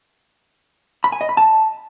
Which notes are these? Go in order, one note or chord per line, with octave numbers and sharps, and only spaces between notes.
B5
G#5
D#5
B5
A5